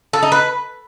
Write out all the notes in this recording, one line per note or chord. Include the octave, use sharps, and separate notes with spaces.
A4
D#4
B4